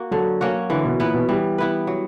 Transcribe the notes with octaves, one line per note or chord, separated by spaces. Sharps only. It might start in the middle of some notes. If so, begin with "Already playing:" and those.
Already playing: A#3 F#4
D3 F#3
A#3 C#4 F#4
D3 E3
B2
A#2 B3 E4 B4
B2
E3 G3
B3 E4 B4
F#3